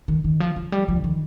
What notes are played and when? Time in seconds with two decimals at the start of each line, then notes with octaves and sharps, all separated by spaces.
0.08 D#3
0.24 D#3
0.40 F3
0.56 F3
0.72 G3
0.88 F3
0.96 D3
1.04 D#3